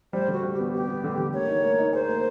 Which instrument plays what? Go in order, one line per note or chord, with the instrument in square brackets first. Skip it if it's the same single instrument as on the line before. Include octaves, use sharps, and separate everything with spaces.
[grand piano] G3 [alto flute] C5
[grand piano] D3 [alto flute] F#4
[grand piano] G3
[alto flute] G4
[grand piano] B3
[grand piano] B3 [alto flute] G4
[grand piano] B3
D3
D3
[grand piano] A#3 [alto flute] C#5
[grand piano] D#4
A#3
D#4
[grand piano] G#4 [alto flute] C5
[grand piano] A#3